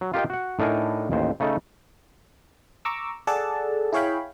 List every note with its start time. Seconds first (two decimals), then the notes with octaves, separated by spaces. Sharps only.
0.01 F#3
0.14 F4 G4 A#4 D#5 G5
0.30 F#4 F#5
0.59 A2 D4 D#4 A#4 G#5
1.11 A1 D#2 C5
1.40 C#3 A3 D#4 A4 A#5
2.85 A#5 C#6 D6 E6
3.27 G#4 A4 D5 F#5 A5
3.93 E4 G#4 C#5 F5 G5 B5